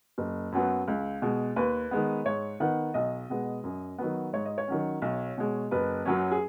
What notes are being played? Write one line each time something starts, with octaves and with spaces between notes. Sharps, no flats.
F#1
F#2 F#3 B3
C#2
B2 G#3
D#2 B4
D#3 G#3 B3
G#2 C#5
D#3 B3 F#5
B1 D#5
B2 G#3 B3
F#2
D#3 F#3 B3
G#2 C#5
D#5
C#5
D#3 F#3 C#4
B1
B2 G#3
F#1 B4
F#2 F#3 C#4
G#4